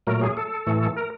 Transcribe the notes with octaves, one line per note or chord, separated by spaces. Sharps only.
A#2 F#3 A3 A#4
G#4
A4
A2 E3 A3
A#4